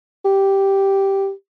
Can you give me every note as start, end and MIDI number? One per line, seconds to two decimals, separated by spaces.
0.25 1.31 67